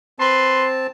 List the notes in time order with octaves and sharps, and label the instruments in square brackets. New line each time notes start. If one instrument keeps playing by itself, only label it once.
[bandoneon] C4 A5 [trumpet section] B4 C6